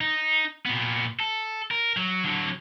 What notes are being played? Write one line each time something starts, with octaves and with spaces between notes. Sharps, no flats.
D#4
A#2 B3
A4
A#4
F#3
D3 F#3